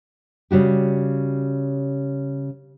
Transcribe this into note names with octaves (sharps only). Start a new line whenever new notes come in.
C#3 G3 F#4 G4